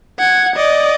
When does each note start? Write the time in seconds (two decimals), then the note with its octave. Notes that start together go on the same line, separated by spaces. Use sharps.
0.19 F#5 G#6
0.56 D5 D#5